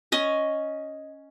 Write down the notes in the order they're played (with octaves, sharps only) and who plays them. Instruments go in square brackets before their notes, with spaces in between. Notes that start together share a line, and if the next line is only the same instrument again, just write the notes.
[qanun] C#4 D#5